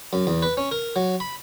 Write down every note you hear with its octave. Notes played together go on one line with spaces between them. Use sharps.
F#2
E2
B4
C#4
A#4
F#3
B5